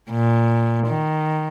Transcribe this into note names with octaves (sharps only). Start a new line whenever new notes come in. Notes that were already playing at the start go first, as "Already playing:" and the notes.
A#2
D#3